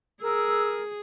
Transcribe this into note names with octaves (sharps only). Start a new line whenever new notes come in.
G#4 A#4 E6